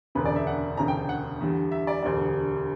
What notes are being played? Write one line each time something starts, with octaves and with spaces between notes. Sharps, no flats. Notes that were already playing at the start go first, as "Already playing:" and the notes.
E1 D2 C#3 B4
D5
E5
F#5
E1 D2 C#3 A#5
G5
F#5
E2 D3 G3
E5
D5
E1 D2 D3 G3 D5